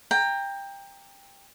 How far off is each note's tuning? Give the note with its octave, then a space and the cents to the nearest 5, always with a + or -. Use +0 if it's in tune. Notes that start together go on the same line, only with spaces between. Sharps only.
G5 +20 A#5 -5